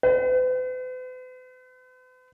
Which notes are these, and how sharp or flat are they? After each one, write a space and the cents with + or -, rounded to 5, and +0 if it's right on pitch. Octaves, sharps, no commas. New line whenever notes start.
B4 +45